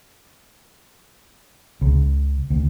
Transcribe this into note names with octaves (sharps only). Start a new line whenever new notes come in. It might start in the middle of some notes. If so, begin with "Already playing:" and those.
C#2
D2